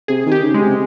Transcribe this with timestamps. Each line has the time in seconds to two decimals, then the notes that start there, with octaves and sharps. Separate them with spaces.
0.08 C3 G#4
0.26 D#3
0.32 G4
0.43 C#3
0.54 G#3
0.60 C3